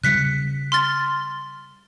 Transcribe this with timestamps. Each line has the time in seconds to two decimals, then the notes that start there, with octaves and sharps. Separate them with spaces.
0.04 C#3 G3 F#6 B6 C#7
0.72 C6 F6 A6